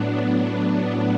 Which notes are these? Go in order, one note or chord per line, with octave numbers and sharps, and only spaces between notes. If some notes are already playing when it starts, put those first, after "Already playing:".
Already playing: A2 F#3 B3 D4
B3